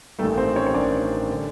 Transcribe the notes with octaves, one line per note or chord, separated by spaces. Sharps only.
A1 G2 D#3 G3 A3 A4
C4 C5
C#4 C#5
C#5
A1 G2 D#3 G3 D4 D5
D3